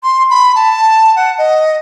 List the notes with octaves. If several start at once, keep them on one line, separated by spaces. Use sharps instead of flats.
C6
B5
A5
F#5
D#5